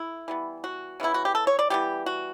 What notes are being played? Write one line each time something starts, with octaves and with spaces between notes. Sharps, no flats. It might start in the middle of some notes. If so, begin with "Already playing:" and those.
Already playing: A3 E4
E3 G3 B3
F#4
C#3 E3 B3 E4
F#4
G4
A4
C#5
D5
E3 G3 B3 G4
F#4